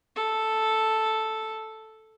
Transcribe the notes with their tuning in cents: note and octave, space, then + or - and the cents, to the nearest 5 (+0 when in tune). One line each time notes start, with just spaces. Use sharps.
A4 +0